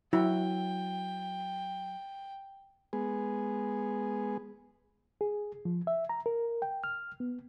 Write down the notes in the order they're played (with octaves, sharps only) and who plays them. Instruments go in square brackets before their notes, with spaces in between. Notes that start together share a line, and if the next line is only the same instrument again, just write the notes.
[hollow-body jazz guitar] F#3 [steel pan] E4 [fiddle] G5
[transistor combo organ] G#3 B3 G#4
[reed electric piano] G#4
F3
E5
A#5
A#4
G5
F6
B3